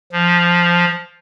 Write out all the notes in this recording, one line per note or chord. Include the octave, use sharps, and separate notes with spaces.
F3